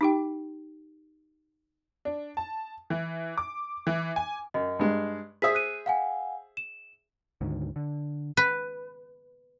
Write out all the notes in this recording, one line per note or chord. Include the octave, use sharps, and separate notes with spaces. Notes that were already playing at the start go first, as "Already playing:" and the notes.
D#4 G4 G5
D4
A5
E3
D6
E3
G#5
F#2 D#5
G2 G#3
G#4 C5 E5 D#6 B6
F#6 D#7
F5 F#5 G#5
E7
D2 G#2 D3 D#3
D3
B4